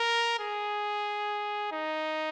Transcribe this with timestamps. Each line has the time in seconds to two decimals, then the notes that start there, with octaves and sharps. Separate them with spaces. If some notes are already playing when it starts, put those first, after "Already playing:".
Already playing: A#4
0.39 G#4
1.72 D#4